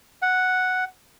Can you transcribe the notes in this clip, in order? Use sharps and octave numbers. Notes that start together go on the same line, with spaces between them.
F#5